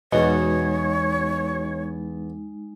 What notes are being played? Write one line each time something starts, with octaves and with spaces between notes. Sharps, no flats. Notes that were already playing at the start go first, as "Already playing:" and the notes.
E2 B2 G#3 D#4 C#5